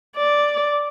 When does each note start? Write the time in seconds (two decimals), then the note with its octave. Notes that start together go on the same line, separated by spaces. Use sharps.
0.16 D5